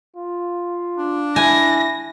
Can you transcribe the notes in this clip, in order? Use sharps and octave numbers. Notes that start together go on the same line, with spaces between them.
F4
D4
E4 G#5 A#6